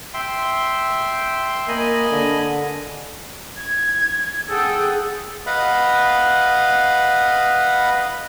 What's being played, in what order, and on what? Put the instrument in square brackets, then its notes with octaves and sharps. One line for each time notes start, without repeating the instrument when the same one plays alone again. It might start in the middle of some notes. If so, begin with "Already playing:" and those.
[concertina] E5 G5 C6
[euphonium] A#3 [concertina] D#5 G#5 B5
[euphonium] D3
[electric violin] G#6
[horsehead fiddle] G#4 F#5 [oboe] A4 [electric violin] G5 D#6
[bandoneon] B4 D#5 F5 F#5 B5